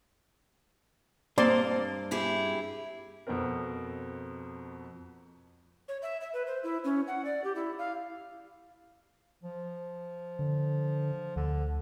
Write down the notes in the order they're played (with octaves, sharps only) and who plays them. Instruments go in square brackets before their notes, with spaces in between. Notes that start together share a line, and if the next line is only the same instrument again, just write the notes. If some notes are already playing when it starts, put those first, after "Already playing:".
[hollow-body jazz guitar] G2 C4 [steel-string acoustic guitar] A#3 D#5 [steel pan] D5 A5 C6
[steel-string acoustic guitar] E4 G4 G#4
[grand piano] F2 B2 B3 C4 A#4
[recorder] C#5
E5
E5
B4
C5
E4
C#4
F#5
D5
G4
E4
F5
[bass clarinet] F3
[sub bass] D3
[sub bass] D2 [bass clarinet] D3